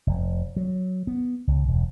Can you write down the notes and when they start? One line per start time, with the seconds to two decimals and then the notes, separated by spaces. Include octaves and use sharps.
0.07 F1
0.56 F#3
1.07 B3
1.47 C#2
1.68 E1